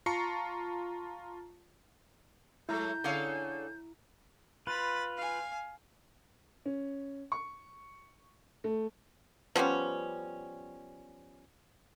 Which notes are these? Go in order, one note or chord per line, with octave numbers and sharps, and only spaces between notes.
F4 A5 A#5 C#6 C7 C#7
F#3 G#3 A3 E4 A#5 G6
D3 C#4 G#4 A4 C#5 F5
F4 B4 B5 A6
F5 G#5
C#4
C#6
A3
F3 G3 B3 C#4